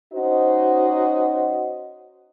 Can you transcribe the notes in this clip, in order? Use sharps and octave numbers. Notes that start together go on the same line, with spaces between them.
C#4 D#4 F#4 C5 D#5